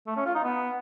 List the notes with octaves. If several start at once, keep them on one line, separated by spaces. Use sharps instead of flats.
A3
C#4
F4
D#4
B3